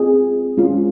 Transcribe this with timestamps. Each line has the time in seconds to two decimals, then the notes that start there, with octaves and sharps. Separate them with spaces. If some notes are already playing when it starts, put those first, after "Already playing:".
Already playing: C4 F4 G#4
0.57 G#3 C#4 F4